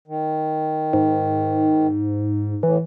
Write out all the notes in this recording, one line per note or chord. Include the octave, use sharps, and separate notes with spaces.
D#3
G#2
A2 E3